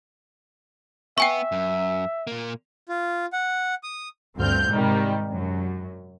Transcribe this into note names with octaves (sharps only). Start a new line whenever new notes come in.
B3 E5 G5 G#5 C#6
F#2
A#2 A#3
F4
F#5
D#6
D2 G2 C4 F6 G6
G#2 C3 D#3 G3
F#2